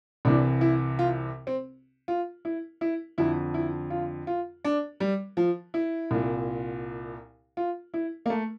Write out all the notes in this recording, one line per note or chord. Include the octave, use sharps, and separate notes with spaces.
C2 C3 E3 D4
E4
F4
C4
F4
E4
E4
F2 D3 E4
E4
F4
F4
D4
G3
F3
E4
C2 A#2
F4
E4
A#3
A3